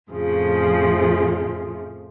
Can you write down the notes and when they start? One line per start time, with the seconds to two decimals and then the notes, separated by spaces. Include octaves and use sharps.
0.11 F2 A2 C#3 F3